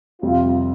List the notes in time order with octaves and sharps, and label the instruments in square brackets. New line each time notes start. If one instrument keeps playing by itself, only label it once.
[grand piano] F2 C3 G3 C4 [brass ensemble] F4